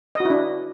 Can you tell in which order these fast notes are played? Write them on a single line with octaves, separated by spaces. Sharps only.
D#5 F#4 E4 D4